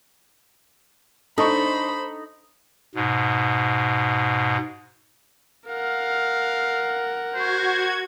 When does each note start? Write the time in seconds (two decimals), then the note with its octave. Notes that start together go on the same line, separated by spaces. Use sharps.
1.38 D4 D#4 A4 C5 D#5 B5 C#6
2.95 G#2 B2
5.68 A#4 F5 F#5
7.35 F#4 C5 G#6